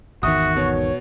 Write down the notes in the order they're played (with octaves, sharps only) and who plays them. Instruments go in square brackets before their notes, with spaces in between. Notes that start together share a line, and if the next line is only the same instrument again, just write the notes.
[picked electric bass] G#1 E2 D#3 [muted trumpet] F#4 [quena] E5 [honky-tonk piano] D#6
[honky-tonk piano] B2 [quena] C#5